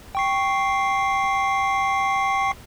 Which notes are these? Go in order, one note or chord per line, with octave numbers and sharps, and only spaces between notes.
G5 C#6 C7